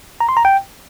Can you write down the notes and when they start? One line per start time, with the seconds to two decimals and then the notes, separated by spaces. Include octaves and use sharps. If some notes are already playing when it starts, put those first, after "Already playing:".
0.20 A#5
0.29 C6
0.37 A#5
0.45 G5